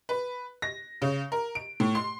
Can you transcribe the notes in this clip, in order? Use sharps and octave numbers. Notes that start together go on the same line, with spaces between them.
B4
A#6
C#3
A#4
D7
A2
C6